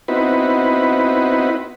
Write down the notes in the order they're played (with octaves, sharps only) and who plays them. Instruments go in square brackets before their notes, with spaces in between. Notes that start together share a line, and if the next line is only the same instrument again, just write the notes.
[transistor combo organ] B3 C4 D#4 E4 F#4 B4